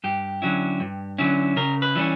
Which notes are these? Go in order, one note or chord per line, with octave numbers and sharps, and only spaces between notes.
G2 G4
D3 F#3 C#4 E4
G2
D3 F#3 C#4 E4
C#3 A#4
B4
E3 G3 C#4